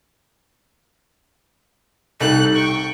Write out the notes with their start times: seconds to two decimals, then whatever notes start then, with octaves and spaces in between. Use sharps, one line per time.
2.20 C2 D#4 A4 F#6
2.55 G5 C#6